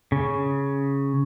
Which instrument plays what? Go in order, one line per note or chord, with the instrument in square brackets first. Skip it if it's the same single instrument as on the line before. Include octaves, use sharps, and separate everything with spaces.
[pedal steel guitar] C#3